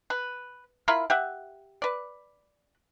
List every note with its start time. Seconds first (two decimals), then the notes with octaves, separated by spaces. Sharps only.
0.10 B4
0.88 E4 F4 A#4 B5
1.10 G4 E5 F#5
1.82 B4 D5